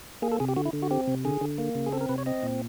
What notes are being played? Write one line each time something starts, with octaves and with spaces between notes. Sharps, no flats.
A#3 G#4
A4
C3 G#4
G4
D3 F#4
E4
D3
F#4
C4 G4
C3
D3 G#4
D3
A#3
C#3
G#4
C4 A4
A#4
C3 B4
C#5
C4 D#5
A#2